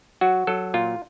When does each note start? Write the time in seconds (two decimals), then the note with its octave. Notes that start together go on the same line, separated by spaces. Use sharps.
0.21 F#3 F#4
0.47 F#3 A4
0.74 A#2 F4